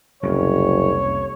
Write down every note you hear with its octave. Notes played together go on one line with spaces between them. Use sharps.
F#1 C2 F2 C#3 C#5